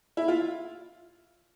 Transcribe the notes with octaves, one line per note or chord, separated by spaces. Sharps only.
E4
F4